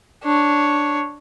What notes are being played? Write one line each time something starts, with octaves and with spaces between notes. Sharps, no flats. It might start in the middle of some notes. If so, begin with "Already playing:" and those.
D4 C#5